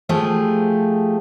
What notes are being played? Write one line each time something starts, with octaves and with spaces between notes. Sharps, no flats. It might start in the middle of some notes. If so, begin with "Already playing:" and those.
F3 A3 G4 G#4